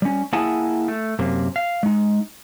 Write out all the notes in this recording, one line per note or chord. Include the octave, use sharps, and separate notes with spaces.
G3 C#4
A#3 E4 G#4 F#5 G#5 A5
A3
F#2 C3 A#3
F5
G#3 D#4